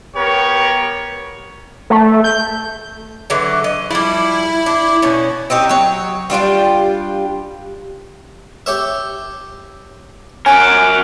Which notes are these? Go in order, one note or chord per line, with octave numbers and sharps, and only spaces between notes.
B3 G4 A#4 C#5
A3
G6
D3 E3 F#3
D#5
F3 G3 E4
D4
B2 C#4
C4 C#4 D#4 G4
F#3 C#5
G3 D4 F4 G4
G4 C#5 E5
C#4 F#4 A#4 F#5 G#5 D6